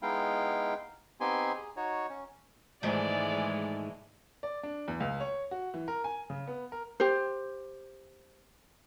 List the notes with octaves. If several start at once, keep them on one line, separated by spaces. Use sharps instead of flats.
G#3 B3 D#4 E4 F5 G5
B3 C4 D#4 G4 G#5 C6
G#4
D#4 F#4 C#5
C#4
G#2 D#3 E3 G#3 A3 D5
D5
D4
E2
C#2
C#5
F#4
E3
A#4
G#5
C#3
B3
A#4
G4 C5